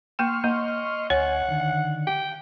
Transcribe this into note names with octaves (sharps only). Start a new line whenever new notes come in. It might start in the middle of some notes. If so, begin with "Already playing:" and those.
A#3 G5 C6 C#6 F6
A#3 D#5
D2 C#5 F#5 G#5
D3 D#3
G5